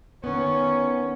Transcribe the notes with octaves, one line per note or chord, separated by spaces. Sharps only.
D#3 B3 C#4